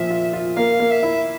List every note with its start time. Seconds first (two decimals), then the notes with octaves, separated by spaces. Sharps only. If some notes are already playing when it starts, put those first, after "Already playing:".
Already playing: A#2 F3 F4 E5
0.10 F4
0.33 F4
0.56 A#3 F5
0.80 A#3
0.91 E5
1.03 E4